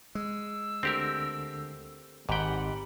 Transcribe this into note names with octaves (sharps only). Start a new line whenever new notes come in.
G#3 E6
D2 D3 C4 G4 A#4 A#6
G#1 G#2 G4 F#5 G5 B5